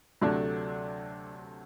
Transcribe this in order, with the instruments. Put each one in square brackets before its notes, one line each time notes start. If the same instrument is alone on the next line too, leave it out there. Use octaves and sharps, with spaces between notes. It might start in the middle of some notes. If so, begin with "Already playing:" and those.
[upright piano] D2 C3 F#3 A3 D4